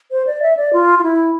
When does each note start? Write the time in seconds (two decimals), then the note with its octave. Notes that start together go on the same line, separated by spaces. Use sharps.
0.11 C5
0.27 D5
0.42 E5
0.57 D5
0.73 F4
0.99 F4
1.03 E4